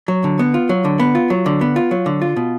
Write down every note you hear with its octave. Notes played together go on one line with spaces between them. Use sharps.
F#3
D3
B3
F4
F#3
D3
B3
F4
F#3
D3
B3
F4
F#3
D3
F4
B2